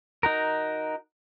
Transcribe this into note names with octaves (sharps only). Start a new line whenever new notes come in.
D#4 F#4 A#4